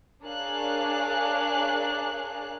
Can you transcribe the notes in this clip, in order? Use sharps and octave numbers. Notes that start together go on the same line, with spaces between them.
D4 G#4 A#4 C#5 F5 F#6